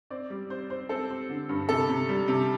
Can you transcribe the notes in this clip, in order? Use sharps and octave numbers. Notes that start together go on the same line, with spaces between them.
C4 D5
G3
C4 C5
C4 C5
C4 A4
C4
D3
G2
C3 A4
C3
G3
C3